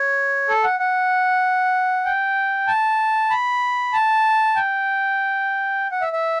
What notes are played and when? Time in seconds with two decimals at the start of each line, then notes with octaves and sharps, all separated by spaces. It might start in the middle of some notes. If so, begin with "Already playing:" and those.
Already playing: C#5
0.49 A4
0.64 F#5
0.80 F#5
2.05 G5
2.67 A5
3.30 B5
3.93 A5
4.56 G5
5.92 F#5
6.02 E5
6.13 E5